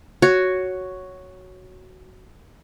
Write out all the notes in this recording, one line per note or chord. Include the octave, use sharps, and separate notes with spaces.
F#4 C#5